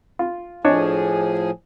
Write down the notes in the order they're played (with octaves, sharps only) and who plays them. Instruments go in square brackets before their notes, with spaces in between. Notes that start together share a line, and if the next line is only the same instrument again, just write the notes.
[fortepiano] F4
[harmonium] A2 F3 G#4 [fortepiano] D4 C#5 D#5